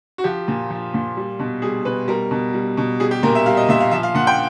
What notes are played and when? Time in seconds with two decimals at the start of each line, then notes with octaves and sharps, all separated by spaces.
0.18 F#4
0.24 F3 G4
0.48 A#2
0.70 F3
0.94 A#2
1.17 G3
1.39 B2
1.62 G3 G#4
1.85 B2 B4
2.08 G3 A#4
2.31 B2
2.54 G3
2.77 B2
3.00 G3 G#4
3.11 G4
3.23 A#2 A#4
3.35 E5
3.46 G3 F5
3.57 D#5
3.69 A#2 E5
3.80 F5
3.91 F3 E5
4.03 F5
4.15 A#2 F#5
4.27 G5